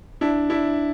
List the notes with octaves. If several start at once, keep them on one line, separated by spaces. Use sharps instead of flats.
D4 E4
D4 E4